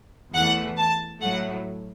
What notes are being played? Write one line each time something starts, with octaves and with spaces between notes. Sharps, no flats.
E2 E3 A3 F#5
A5
A2 F#3 A3 F#5